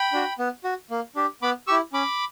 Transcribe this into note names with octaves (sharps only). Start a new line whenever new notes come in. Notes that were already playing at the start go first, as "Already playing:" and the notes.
Already playing: G5 B5
D4 F#4
B3
F#4
A#3
D4 G4
B3 B5 D6
E4 G4 C#6 E6
C#4 B5 D6